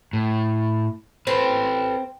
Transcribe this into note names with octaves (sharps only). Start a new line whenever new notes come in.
A2
C4 A4 B4